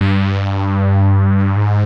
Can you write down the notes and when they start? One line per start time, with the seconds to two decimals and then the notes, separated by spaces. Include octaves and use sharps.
0.01 G2
1.56 G#2